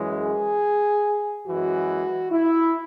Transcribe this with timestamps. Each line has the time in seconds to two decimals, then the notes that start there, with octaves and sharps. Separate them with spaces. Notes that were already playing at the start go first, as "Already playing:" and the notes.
Already playing: F#2 E3 G#3 C#4
0.17 G#4
1.46 F#2 E3 G#3 F#4
2.31 E4